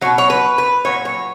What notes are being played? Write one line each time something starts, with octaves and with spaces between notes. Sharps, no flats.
B2 F#3 C#5
C#5
B4
B4
A#2 F#3 C#5
C#5